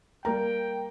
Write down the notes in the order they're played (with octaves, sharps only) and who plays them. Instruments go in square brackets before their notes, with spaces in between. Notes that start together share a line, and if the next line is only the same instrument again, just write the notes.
[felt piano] G3 A#3 A#5 [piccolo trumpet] G5